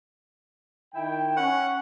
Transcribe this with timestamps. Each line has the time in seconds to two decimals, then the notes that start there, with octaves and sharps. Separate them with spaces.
0.94 D#3 E4 G5
1.37 C#4 F#5